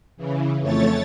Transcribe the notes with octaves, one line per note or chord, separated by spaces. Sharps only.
C#3 E3
F2 A3 C#5 A6